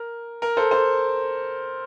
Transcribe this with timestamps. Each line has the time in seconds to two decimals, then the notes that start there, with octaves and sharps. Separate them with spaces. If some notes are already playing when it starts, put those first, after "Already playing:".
Already playing: A#4
0.42 A#4
0.57 A4 C5
0.71 A4 C5